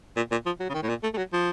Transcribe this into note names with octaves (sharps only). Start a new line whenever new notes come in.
A#2
A#2
F3
F#3
C#3
D#3
A2
A#2
A3
A3
F#3
F3